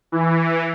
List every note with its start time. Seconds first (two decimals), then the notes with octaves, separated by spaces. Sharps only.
0.12 E3